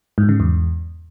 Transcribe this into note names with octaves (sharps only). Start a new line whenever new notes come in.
G#2
C#3
E2